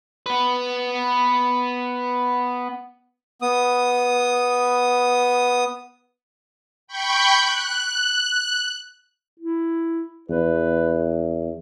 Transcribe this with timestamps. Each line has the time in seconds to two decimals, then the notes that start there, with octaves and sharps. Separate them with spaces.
0.26 B3 B4
3.42 B3 D#6
6.88 G5 B5 C#6 G6
7.37 F#6
9.40 E4
10.30 E2 B4